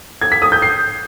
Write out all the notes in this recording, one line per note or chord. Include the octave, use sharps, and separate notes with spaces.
G#6
B6
D#6
G6
C7